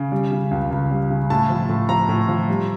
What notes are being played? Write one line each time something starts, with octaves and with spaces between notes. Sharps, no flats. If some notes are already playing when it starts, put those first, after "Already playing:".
Already playing: C#3
G3
C#3
C#2
C#2
G3
C#3
A2 A5
F3
A2
F3 A#5
A2
F3
G3